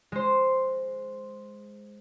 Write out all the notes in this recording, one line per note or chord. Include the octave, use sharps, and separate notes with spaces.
G#3 C5